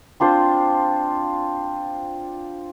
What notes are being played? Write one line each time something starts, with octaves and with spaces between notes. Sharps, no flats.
C4 D4 F4 C5